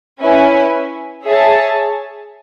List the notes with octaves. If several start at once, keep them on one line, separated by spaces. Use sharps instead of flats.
C#4 E4 B4 E5 G#5
G#4 C#5 E5 A5